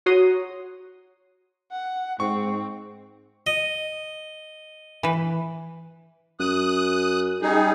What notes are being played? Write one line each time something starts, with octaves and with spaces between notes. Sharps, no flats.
F#4 C#5 F#5 A#5 C6 D#6
F#5
G#2 C4 C#6
D#5
E3 B4
F#2 D#6 F#6
G3 D#4 G#4